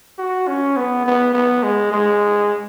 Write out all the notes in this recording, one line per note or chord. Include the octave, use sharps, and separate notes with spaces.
F#4
C#4
B3
B3
B3
G#3
G#3